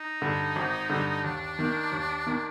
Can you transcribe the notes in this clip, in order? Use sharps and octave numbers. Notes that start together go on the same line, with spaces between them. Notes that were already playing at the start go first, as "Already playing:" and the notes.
Already playing: D#4
G2 D3
G#1
G2 D3
D#2 D4
D#3 A#3
D#2
D#3 A#3